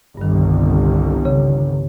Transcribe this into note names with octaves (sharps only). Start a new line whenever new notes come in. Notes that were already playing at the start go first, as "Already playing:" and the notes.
G1 C2 G2 D#3
C#3